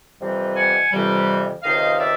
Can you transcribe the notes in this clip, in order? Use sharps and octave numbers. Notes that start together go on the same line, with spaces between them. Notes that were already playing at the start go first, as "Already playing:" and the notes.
F2 C3 E3 G3
F#5 G#5
F2 C3 E3 G3
C#2 C3 D#3 D#5 F5
D5 E5